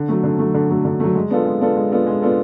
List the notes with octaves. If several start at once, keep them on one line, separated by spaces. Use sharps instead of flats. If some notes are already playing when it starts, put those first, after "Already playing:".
Already playing: D3
F#3 A3
D3
F#3 A3
D3
F#3 A3
D3
F#3 A3
G#3
B3 D4 F4 A4
G#3
B3 D4 F4 A4
G#3
B3 D4 F4 A4
G#3
B3 D4 F4 A4